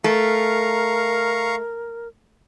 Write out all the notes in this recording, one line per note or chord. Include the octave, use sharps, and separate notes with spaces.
A3 A#4 F5 A#5 C#6